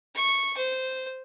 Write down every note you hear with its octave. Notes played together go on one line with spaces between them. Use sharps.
C#6
C5